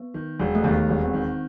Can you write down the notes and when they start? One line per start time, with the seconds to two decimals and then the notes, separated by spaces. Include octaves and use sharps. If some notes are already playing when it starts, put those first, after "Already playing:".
Already playing: B3
0.14 D#3
0.39 E1
0.55 A3
0.64 D#2 B3
0.89 E1
1.01 C4
1.14 D#3